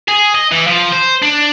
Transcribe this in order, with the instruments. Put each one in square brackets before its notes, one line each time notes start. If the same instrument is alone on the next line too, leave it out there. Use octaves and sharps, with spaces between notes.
[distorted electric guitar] G#4
D#5
E3
F3
C5
D4